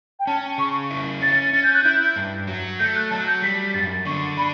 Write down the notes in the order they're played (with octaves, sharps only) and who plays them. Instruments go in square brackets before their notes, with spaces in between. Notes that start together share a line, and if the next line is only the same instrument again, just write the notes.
[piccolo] G5
[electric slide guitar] C#4 [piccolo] A5
[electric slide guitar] C#3 [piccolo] C#6
[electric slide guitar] E4
[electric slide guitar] C#4 [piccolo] A6
[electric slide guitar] C#4 [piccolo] A6
[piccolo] G6
F#6
[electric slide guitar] E4 [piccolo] G6
[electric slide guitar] G2
F#3
[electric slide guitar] A3 [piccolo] G6
[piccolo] F#6
[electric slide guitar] F#3 [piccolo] A5
[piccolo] G6
[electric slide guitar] G3 [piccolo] B6
[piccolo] B6
[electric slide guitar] F#2 [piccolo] A6
[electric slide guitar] D3 [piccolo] C#6
[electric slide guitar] D4 [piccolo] B5